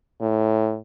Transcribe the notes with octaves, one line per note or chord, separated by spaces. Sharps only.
A2